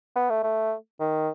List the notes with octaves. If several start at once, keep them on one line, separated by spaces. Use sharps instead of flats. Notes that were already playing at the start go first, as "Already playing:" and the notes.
B3
A3
A3
D#3